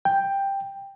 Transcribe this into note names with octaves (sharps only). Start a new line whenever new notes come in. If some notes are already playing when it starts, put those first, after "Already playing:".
G5